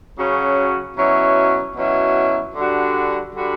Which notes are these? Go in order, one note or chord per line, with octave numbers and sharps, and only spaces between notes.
C#3 F#3 C#4 F#4
B2 F#3 C#4 E4
B2 F#3 C#4 E4
D3 G3 D4 F#4
D3 G3 D4 F#4